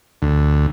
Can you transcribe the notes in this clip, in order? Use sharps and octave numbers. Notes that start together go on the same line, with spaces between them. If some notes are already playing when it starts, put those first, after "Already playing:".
D2